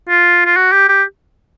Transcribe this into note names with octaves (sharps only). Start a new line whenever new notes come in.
F4
F4
F#4
G4
G4